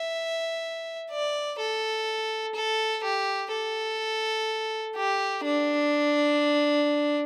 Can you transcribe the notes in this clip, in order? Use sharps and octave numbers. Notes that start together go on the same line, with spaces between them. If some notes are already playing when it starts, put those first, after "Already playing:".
Already playing: E5
D5
A4
A4
G4
A4
G4
D4